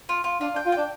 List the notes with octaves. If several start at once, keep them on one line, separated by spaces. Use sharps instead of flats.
F4
F4
D4 F4
D4
G5
F4
D4 G5